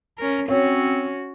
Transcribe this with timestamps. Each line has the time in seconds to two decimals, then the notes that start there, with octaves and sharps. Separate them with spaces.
0.18 C#4 A#4
0.48 C4 C#4 F#4 C#5